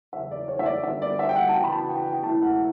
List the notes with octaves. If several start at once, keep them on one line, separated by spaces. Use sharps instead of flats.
E2 C#3 F#3 E5
D5
C#5
E5
D5
D3 G3 B3 F#4 E5
D5
E5
G5
F#5
A5
C#3 E3 B3 D4 F#4 G5
B5
A5
G5
G5
C#2 B2 F#3 A3 E4 A5
F#5